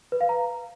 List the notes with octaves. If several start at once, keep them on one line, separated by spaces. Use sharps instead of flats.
B4
F5
A#5